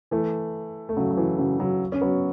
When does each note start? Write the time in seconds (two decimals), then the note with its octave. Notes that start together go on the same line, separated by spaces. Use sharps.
0.11 E3 A3
0.89 A3
0.97 C#3 F#3
1.11 F#3
1.17 E3
1.38 C#3 F#3
1.59 C#3 F#3
1.92 C#4
2.01 F#3 B3